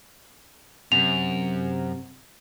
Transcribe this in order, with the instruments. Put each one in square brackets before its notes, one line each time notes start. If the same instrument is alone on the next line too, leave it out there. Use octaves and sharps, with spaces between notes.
[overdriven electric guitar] F#2 [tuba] C3 [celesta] F7